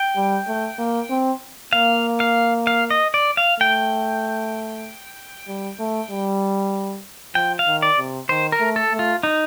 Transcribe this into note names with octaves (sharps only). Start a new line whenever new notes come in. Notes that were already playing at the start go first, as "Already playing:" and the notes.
Already playing: G5
G3
A3
A#3
C4
A#3 F5
F5
F5
D#5
D5
F5
A3 G5
G3
A3
G3
F3 G5
F5
D#3
D5
C3
D#3 C5
A#4
A3
A4
A3
F4
D#4